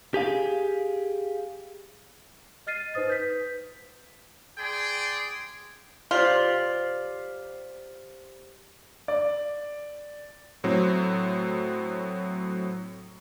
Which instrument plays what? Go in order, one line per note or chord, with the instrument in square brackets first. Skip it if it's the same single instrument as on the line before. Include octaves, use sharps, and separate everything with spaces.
[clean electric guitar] G4 G#4 F5
[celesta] D#5 F6 A6 C7 D#7
D#4 B4 C5 D#6 A6
B4 G6 B6
[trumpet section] G#4 D5 G5 C6
[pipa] F4 [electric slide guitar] G4 C5 D5
[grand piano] D5
[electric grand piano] A2 F#3 C4